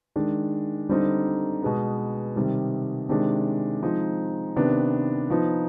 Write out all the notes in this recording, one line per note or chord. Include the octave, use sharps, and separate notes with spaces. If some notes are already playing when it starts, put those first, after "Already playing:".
D#3 G#3 D4
D3 G3 C4 D#4
B2 G#3 B3
C3 D#3 G3
C3 D#3 G#3 D4
F3 G#3 C4 D#4
C3 D#3 B3 D4
F3 B3 D#4